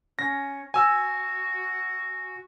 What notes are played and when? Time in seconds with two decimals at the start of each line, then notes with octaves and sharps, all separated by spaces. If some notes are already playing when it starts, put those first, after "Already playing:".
0.19 C#4 A#6
0.74 F#4 G#5 E6